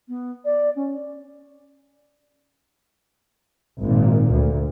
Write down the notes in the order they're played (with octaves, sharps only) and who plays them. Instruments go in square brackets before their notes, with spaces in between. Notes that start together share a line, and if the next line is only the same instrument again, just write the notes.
[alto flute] B3
D5
C#4
[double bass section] G#1 A#2
D2